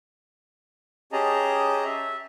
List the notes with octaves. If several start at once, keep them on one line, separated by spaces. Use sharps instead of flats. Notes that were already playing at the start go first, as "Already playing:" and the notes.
C#4 G4 G#4 D#5 A5 A#5
E5